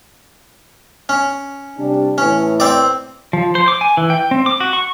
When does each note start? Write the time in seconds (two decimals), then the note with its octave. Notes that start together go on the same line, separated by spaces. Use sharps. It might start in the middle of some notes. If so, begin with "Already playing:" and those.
1.09 C#4
1.78 C3 G3 D4
2.18 A2 E3 C#4
2.60 C4 D5
3.33 F3
3.55 C5
3.68 D6
3.81 G#5
3.97 E3
4.10 G5
4.31 C4
4.46 D6
4.60 F#4
4.73 C#6